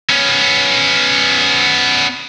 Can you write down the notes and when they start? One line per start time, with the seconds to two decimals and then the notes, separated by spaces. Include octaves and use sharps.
0.10 B3 C#4